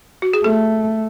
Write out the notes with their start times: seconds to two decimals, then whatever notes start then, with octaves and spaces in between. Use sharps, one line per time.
0.22 F#4
0.33 G#4
0.44 A3 A4